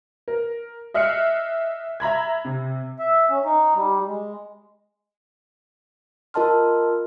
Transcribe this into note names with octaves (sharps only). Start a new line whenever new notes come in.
A#4
D#5 E5 F6 F#6 C7 C#7
E5 A#5 B5 G#6
C3
E5
C#4
D#4
G3
G#3
F4 A#4 D#5 A5 C6 F6